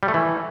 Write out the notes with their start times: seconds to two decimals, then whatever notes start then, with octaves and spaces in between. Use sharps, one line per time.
0.03 G3
0.08 A3
0.14 E3